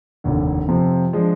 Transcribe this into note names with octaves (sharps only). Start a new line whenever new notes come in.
F1 D#2 D3
F2 C3 F3 C4
F3 G#3 D4